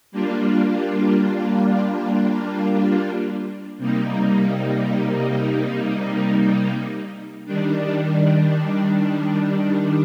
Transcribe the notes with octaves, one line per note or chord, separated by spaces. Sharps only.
G3 A#3 D4 F4
C3 G3 A#3 D#4
D#3 G3 D4